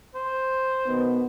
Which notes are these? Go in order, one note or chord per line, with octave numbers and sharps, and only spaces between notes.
C5
B2 D#3 B3